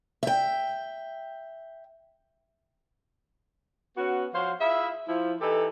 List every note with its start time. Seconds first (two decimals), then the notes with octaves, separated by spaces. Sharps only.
0.23 E5 G5
3.96 B3 C#4 F#4
4.35 F3 F#4 C5 C#5 F5
4.61 E4 F4 G#4 E5
5.08 F3 E4
5.41 E3 D#4 G4 A4